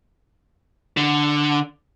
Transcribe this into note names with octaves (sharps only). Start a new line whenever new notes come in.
D3